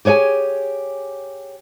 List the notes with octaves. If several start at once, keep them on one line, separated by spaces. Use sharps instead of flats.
G4 G#4 C#5 F#5 G#5